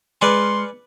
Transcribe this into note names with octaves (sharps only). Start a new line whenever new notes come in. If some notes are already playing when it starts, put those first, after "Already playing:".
G#3 B4 D5 G#5 C6 F6 C#7